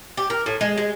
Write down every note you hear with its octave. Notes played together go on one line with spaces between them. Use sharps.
G4
A#4
A2
G#3
G#3